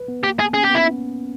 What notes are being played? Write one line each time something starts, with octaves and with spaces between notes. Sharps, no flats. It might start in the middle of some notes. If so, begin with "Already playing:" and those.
Already playing: B4
B3
A#3 G4
B3 G#4
C#4 G#4
G4
B3 E4